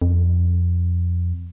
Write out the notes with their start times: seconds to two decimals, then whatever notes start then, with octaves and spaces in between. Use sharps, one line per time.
0.02 F2